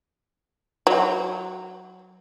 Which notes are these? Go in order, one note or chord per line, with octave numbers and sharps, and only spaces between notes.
F#3